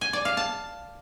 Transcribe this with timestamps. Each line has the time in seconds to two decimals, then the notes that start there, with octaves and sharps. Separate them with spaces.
0.01 G#5
0.13 D5
0.25 F5
0.37 A5